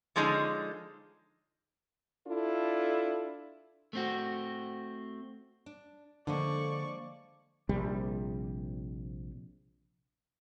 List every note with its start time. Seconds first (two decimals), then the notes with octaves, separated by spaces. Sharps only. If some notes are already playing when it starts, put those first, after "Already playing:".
0.16 D3 F3 G#3 C#4 D#4
2.27 D4 E4 F4 A4
3.93 A3 C4 F#4
5.66 D4
6.27 D3 F3 G#3 A#3 D5 C#6
7.69 A#1 C3 G3